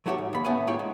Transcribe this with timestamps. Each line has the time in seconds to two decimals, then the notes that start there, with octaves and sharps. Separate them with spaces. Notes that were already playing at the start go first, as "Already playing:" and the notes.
0.06 F#3 A3 E4 F#4 G4 C#5
0.18 G#2
0.33 D#2 B5
0.44 A2 A3 B3 C#4 G#5 B5
0.67 D#2 G#2 E4 F4 C#5 G5
0.79 G#3